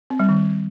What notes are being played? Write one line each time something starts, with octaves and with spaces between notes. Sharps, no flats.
C4
G3
D#3